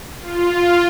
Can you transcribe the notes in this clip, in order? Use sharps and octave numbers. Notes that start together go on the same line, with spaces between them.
F4